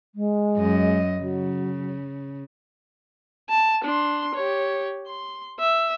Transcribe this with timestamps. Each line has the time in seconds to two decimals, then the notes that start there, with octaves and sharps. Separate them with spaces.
0.15 G#3
0.57 F#2 D#5
1.18 C#3 F#3
3.50 A5
3.84 D4 C6
4.35 G4 C#5
5.07 C6
5.60 E5